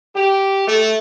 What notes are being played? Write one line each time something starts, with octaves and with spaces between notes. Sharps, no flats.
G4
A3